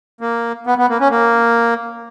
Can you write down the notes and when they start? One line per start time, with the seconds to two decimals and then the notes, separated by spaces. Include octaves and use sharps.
0.21 A#3
0.67 B3
0.78 B3
0.89 A#3
1.00 C#4
1.11 A#3